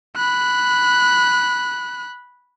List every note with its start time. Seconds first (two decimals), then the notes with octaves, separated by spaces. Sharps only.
0.16 B5 F#6